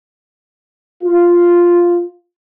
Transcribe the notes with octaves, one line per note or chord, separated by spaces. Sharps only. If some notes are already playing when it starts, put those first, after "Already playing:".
F4